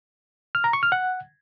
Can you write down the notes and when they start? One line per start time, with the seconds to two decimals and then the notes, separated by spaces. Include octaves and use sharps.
0.55 F6
0.64 A#5
0.73 C#6
0.83 F6
0.92 F#5